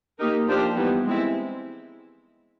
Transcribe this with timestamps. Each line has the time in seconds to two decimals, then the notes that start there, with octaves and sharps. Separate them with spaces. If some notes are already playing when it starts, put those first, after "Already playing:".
0.19 A#3 D#4 G4 A#4
0.47 F3 A#3 D4 G4 C5
0.76 E3 G3 B3 D#4
1.05 G#3 C4 E4